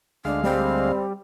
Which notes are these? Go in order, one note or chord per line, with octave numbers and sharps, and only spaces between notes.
D2 G#3 D4 F5
G3 C4